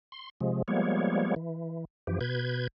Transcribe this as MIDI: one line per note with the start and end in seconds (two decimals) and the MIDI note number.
0.12 0.30 84
0.41 0.62 48
0.41 0.62 53
0.41 0.62 56
0.68 1.35 53
0.68 1.35 55
0.68 1.35 56
0.68 1.35 58
0.68 1.35 59
0.68 1.35 73
1.36 1.85 52
2.07 2.19 42
2.07 2.19 52
2.07 2.19 53
2.07 2.19 67
2.21 2.67 47
2.21 2.67 71
2.21 2.67 91
2.21 2.67 92